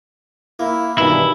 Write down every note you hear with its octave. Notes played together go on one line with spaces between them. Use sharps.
A#3 E4
G2 B2 D#3 E3 E4